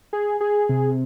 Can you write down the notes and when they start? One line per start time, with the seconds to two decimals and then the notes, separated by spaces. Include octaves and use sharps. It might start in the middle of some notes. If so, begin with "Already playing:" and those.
0.13 G#4
0.41 G#4
0.69 C3